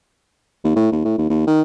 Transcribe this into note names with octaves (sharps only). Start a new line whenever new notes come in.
D#2
A2
D#2
A2
D#2
D#2
D#3